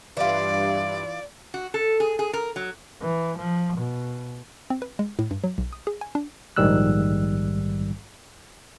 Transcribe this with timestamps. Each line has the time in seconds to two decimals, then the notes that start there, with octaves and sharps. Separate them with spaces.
0.17 G2 E3 F4 D5
1.54 F#4
1.74 A4
2.00 G#4
2.19 G#4
2.33 A#4
2.56 F#3
3.01 E3
3.39 F3
3.78 B2
4.70 C4
4.82 B4
4.99 G#3
5.19 A2
5.31 G2
5.44 F#3
5.58 B1
5.73 D#6
5.87 G#4
6.01 G#5
6.15 D4
6.56 A#1 G#2 D#3 G3 E6 F#6